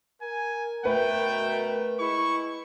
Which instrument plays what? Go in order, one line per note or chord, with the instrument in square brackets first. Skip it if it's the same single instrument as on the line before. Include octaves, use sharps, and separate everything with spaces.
[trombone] A#4 [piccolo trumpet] G#5
[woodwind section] F#2 B2 A3 [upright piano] B4 [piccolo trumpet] G5
[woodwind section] G#3 E4 [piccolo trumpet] C#6